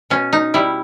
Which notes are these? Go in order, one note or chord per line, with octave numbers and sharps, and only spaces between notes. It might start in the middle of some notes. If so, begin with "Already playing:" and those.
B2 C#4
D#4
G3 E4